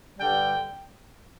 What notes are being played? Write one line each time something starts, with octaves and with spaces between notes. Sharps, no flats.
G2 D3 G3 G5